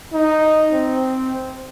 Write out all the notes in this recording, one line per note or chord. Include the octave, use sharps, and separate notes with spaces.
D#4
C4